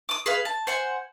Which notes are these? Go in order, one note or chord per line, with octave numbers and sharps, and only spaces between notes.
D6 D#6
G#4 B4 F5
A5
C5 F#5 G#5